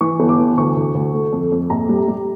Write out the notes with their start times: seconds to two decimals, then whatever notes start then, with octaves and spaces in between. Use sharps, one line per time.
0.01 E3 C#6
0.20 G1
0.29 D6
0.39 E3
0.57 D2 C#6
0.76 D2
0.95 D2
1.14 A3
1.32 F2
1.52 F2
1.70 A#1 A#5
1.89 G3
2.08 G3